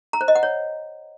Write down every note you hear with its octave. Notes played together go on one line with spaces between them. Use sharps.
A#5
C5
D#5
F#5
C#5